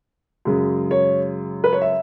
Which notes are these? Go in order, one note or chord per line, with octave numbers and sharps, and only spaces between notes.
F#2 C#3 G#3
C#5
B4
C#5
E5